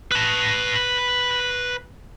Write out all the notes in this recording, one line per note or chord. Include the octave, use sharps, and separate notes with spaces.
B4 A5